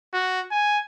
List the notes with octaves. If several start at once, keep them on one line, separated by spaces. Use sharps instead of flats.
F#4
G#5